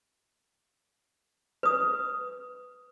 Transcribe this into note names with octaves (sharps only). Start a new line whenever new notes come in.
B4 D#6